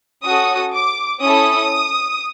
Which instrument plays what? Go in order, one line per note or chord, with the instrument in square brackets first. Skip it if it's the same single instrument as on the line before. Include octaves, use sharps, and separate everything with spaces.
[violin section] C#4 F#4 A4 D#6
D6
C#4 E4 A4 D#6